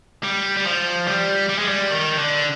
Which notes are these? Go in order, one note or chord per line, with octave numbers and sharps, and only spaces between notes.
G3
G3
F3
G3
G3
G#3
G3
D#3
D3